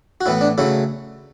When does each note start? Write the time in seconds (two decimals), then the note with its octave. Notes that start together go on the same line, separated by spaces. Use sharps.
0.21 F#4
0.26 A2 E3 B3 E4
0.41 D4
0.58 C#3 F#3 A3 E4